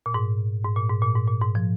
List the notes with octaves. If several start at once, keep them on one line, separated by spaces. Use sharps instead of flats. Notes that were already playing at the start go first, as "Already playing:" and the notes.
A#2
G#2
G#2
A#2
G#2
A#2
G#2
A#2
G#2
F3